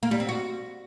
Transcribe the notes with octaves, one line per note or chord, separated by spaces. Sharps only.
A#3
G3
C4
F#4